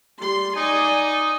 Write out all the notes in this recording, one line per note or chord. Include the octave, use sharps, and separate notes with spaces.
G3 C6
D#4 D5 G#5